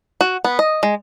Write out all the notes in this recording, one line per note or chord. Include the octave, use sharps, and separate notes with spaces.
F#4
B3
D#5
G#3